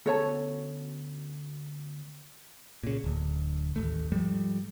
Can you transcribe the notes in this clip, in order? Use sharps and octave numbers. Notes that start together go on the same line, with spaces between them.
D2 B2 C#4 A4 C#5 A5
A#2 C#3
D1 D2
A1 D#2 A3
G#2 F3 G3 A3